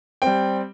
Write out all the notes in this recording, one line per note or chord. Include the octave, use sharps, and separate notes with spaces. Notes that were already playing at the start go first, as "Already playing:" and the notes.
G3 C4 G5